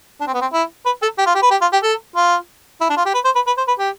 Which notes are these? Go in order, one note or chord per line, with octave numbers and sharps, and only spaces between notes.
D4
C4
B3
C4
E4
B4
A4
G4
F4
G4
B4
G4
F4
G4
A4
F4
E4
D4
F4
G4
B4
C5
B4
B4
C5
B4
G4